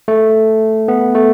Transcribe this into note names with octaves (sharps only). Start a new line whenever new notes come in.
A3
B3
A3